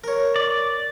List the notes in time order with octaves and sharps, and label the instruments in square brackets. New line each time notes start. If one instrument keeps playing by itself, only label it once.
[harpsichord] A#4 C#5
[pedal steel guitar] D5